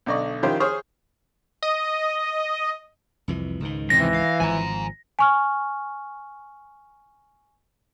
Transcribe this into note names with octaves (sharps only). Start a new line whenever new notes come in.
B1 D3 D5 D#5 C#6
D#3 F3 C#4 E4 G4 C5
G#4 C5 C#5 C#6 D#6 F6
D#5
C2 F2 E3
C#2 G#2 D#3
F2 C3 E3 A#6
F5
G#1 F3 G#5 A#5
G#5 C#6 F6